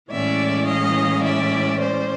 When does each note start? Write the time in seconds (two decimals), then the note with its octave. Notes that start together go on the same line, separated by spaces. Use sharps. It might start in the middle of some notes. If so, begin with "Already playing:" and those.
0.10 A2 E3 G#3 C#4 D5 E5
0.68 D#5 F5
1.23 D5 E5
1.81 C5 D5